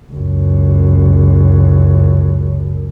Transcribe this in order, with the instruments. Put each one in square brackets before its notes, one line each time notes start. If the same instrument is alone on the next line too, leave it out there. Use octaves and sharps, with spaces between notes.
[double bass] C#2 F#2